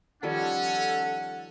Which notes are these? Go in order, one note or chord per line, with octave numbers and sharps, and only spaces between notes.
D#3 F3 G3 C#4 A4 F#5